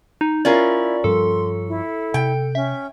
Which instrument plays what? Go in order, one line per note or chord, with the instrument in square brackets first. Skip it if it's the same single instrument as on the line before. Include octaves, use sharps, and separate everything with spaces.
[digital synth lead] D#4
[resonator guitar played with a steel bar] C#4 F4 A#4 [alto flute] E4 [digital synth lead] D5
[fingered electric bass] G2 F3 G3 [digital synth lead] A4 [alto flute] C6
[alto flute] E4
[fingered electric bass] C3 [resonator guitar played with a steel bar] G5
[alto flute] C#4 [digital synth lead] E5